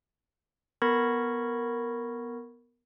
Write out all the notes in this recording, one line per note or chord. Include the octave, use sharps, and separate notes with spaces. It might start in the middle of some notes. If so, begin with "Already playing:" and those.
B3 A#4 B5 C#6 G#6 A#6